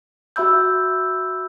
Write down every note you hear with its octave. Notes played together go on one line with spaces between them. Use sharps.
F#4 E5 B5 E6 G6